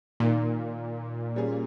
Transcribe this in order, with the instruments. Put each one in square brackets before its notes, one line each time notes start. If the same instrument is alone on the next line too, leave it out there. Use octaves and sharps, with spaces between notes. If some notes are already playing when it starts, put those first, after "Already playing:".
[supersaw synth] A#2 [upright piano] D#3 A#3 D#4
[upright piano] G3 C#4 G#4